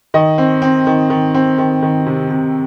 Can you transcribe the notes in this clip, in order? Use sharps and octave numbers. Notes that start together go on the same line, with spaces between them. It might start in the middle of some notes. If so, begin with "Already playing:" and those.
D#3 D#5
C4
C4
D#3
D#3
C4
D#3
D#3
C3
C3